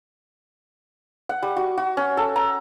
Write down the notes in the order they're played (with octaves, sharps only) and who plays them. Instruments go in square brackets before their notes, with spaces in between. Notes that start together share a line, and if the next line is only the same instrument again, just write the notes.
[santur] F#5
G3
F#4
F#4
C#4
A4
A#5